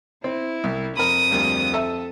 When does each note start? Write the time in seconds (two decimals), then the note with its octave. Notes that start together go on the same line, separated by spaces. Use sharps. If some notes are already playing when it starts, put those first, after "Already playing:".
0.24 C4 E4
0.64 C2
0.97 F2 A#4 B5 D#6
1.31 D2 G3 A#3
1.74 A4 E5 A5